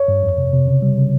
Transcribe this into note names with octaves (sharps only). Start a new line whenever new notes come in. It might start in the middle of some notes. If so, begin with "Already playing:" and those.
Already playing: C#5
G2
F2
C3
C3
C#3
G3
C#3